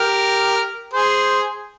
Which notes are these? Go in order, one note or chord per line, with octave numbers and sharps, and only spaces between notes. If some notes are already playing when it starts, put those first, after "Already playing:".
Already playing: G4 A#4
G#4 C5